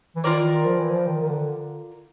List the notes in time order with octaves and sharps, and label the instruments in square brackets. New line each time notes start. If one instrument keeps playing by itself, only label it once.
[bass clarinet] E3
[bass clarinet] D#3 [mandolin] F4 A#4 D5
[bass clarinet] F3
E3
F3
D#3
D#3
D3